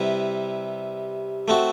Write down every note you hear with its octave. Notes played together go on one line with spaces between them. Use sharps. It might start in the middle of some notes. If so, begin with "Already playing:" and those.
Already playing: C3 G3 C4 E4 B4
A3 C4 F#4